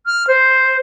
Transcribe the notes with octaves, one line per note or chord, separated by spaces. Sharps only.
F6
C5